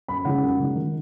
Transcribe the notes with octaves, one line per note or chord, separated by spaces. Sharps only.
F#2 B5
C#3 F3 G#3 D#4 F#5
F#2
C#3 F3 G#3 D#4
D#3